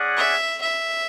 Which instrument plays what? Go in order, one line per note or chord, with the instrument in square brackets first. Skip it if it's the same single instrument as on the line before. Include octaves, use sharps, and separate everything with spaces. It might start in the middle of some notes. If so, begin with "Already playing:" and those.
Already playing: [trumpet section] C#4 G#4 D5 F#5
[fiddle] E5
E5